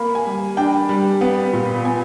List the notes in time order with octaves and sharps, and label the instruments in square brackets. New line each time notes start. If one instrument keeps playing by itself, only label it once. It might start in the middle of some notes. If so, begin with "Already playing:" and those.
Already playing: [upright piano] A#3 B5
G#5
G3
D4 G5
G3
B3
A#2
B3 G#5